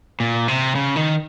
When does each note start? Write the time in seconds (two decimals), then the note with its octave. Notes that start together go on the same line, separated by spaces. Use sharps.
0.20 A#2
0.48 C3
0.75 C#3
0.96 D#3